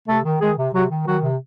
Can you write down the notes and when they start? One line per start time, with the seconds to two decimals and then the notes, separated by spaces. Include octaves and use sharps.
0.08 C3 A3 A4
0.25 D#3
0.41 D#3 G#3 G#4
0.58 C3
0.73 C3 F#3 F#4
0.90 D#3
1.07 D#3 F#3 F#4
1.22 C3